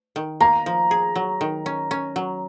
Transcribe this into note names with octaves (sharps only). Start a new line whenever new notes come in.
D#3
A#3 A#5
F3
G#4
F#3
D#3
C#4
C#4
F#3